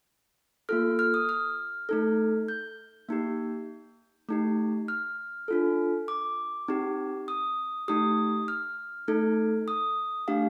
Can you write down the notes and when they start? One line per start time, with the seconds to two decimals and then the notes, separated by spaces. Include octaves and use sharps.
0.69 A#3 F4 A4 F6
0.99 F6
1.14 D#6
1.29 F6
1.89 A3 D#4 A4
2.48 G6
3.09 A#3 D#4 G4
4.29 A3 D#4 G4
4.88 F6
5.48 D4 F4 A4
6.08 D6
6.68 C4 D#4 G4
7.28 D#6
7.88 A3 D#4 G4 D#6
8.48 F6
9.08 A3 D#4 A4
9.68 D#6
10.28 A3 D4 G4 F5